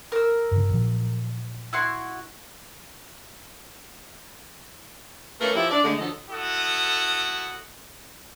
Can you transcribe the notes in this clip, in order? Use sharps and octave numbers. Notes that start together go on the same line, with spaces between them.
A#4 E6
G2 C#3
A#2 F3 F#3
E4 F#4 C6
A3 A#3 C#4 E4 A#4 B4
F3 E4 G4
D4 D5
D3 G#3 A3
D3 F3 F#3 A4 D#5
E4 F#4 A4 D#6